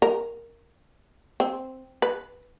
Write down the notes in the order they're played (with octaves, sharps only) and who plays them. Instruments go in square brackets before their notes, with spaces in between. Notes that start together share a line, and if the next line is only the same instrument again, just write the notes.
[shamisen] A#4
C4
B4